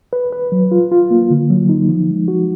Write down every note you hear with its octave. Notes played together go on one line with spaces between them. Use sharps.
B4
B4
F#3
F4
F4
A#3
D3
F#3
D#4
F3
G#3
F#4